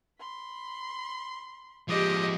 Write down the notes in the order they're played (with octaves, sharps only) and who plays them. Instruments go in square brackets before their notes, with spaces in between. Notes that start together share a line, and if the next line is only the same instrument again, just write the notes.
[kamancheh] B5 C6
[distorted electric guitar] F3 G#3 [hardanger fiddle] G4 D#5 [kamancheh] D6